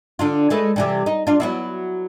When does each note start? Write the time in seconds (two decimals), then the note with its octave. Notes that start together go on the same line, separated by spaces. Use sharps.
0.19 D3 D4 F4
0.50 G#3 A3 B4
0.76 C3 E3 G3
1.06 D#4
1.27 D4 F4
1.40 F#3 B3 E4